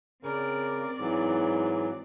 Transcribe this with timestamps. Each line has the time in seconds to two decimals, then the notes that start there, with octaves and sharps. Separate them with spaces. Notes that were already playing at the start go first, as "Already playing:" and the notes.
0.24 C#3 C4 A#4 D5
1.00 G#2 E3 F#3